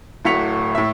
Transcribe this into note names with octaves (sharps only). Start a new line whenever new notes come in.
D1 A2 F#4 B6 C#7 F7
A2 E5